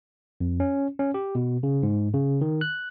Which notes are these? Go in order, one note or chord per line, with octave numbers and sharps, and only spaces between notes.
F2
C#4
C#4
G4
B2
C#3
G#2
C#3
D#3
F#6